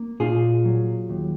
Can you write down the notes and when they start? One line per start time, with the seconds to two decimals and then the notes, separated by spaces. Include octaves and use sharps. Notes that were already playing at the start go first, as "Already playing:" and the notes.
Already playing: A#3
0.20 A#2 F4 G#4
0.65 F#3
1.10 D#2